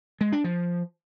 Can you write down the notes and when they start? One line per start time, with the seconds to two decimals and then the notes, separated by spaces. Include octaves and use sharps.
0.21 G#3
0.32 D4
0.44 F3